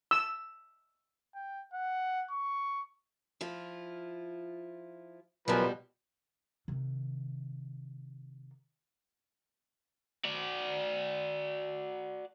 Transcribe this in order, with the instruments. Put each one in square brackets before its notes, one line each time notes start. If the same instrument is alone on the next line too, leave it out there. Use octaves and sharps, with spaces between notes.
[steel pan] E6
[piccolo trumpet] G5
F#5
C#6
[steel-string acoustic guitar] F3 E4 F4
[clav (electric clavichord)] B1 A#4 G#5 [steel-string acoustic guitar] B2 G3 [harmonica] F3 B4
[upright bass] C3 D#3
[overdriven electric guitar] F#4 D5